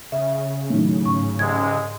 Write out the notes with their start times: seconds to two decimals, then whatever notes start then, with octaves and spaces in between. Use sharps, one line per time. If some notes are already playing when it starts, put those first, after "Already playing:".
0.12 C#3 E5
0.70 A2 D#3 F#3
1.05 G#2 C#6
1.39 C2 G#3 G#6